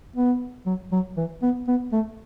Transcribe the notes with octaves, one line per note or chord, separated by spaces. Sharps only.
B3
F#3
F#3
E3
B3
B3
A3